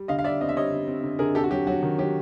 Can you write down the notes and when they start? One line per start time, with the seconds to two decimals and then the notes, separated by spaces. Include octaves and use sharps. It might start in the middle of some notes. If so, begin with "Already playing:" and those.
Already playing: G3
0.08 D3 D#5 F5
0.19 F5
0.24 G3 D5 E5
0.41 C4 D#5
0.49 E5
0.57 G3 C#5 D#5
0.72 D3
0.88 C4
1.04 D3
1.19 D3 G#4 A#4
1.35 C3 G4 A4
1.44 F#4
1.51 F#3 G4
1.67 F#3 F#4
1.83 D#3
1.98 F#3 G4